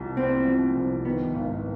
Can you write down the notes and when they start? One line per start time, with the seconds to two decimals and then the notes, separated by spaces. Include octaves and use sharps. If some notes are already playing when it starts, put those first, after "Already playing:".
Already playing: C2 C3 F3
0.17 B3 C4
0.47 F3
0.76 C2
1.05 D#3 B3
1.35 G#1